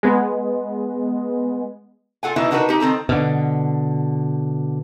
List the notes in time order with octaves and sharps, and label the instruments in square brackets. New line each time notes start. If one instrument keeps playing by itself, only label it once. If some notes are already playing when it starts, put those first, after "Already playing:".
[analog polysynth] G#3 B3
[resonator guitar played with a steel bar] F4 A4 F#5 G#5
B2 D#3 E3 D#4 E4
D4 D#4 F#4 G4 A#4 B4
D#4 G4
D#3 C4 A4 A#5
[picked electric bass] B2 D3